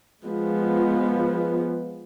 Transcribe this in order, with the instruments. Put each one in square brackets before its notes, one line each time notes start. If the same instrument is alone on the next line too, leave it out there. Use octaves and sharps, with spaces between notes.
[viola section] F3 G#3 B3